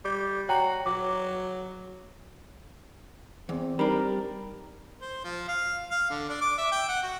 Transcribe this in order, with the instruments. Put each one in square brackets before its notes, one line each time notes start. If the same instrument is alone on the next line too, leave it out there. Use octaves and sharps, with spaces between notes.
[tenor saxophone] G3 [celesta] D6
[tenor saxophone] F#4 [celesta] C#5 G5 A#5
[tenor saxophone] F#3 [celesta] D6
[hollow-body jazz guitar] E2 [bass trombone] C4
[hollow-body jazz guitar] G3 D4 [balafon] D#4 [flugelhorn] A#4
[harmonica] C5
F3
F5
F5
D3
D4
D6
E5
G5
F#5
F#4